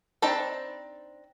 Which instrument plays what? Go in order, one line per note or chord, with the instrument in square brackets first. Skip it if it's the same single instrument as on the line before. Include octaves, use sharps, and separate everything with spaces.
[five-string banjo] C4 D4 D#4 A5 B5